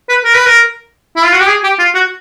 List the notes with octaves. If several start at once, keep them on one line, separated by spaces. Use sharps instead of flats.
B4
A#4
B4
A#4
E4
F4
F#4
G4
G#4
G4
F4
F#4